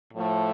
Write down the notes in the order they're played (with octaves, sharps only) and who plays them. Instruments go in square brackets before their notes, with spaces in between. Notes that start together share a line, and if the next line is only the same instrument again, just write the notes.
[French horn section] A2 F3 A3